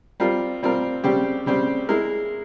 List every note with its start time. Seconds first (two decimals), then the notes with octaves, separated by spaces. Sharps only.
0.20 G3 C4 F4 A#4
0.63 G3 C4 F4 A#4
1.04 C#3 G3 C4 G4
1.46 C#3 G3 C4 G4
1.89 G#3 E4 A#4